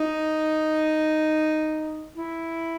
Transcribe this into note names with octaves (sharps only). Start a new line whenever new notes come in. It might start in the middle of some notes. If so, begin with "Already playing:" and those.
Already playing: D#4
E4